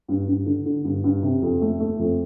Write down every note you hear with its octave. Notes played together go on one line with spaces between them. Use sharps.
G2
G2
D3
D3
G2
G2
C3
F2
A3
A3
F2